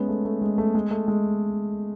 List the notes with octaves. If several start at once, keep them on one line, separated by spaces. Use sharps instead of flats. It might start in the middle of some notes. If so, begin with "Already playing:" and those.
Already playing: G#3 B3 C#4
A3
A3
G#3
A3
G#3
A3
G#3